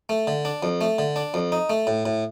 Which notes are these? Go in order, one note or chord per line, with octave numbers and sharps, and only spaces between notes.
A3
D3
D4
F2
A3
D3
D4
F2
D#4
A3
A2
A2